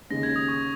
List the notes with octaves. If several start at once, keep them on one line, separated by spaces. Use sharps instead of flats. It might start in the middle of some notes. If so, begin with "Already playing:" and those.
D#2 C#3 G#3 A#6
G#6
D#6
C#6